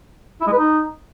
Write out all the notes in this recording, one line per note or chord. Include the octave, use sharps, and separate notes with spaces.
E4
G#3
B4
D#4